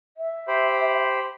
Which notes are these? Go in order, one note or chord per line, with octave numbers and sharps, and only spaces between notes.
E5
G4 C5 B5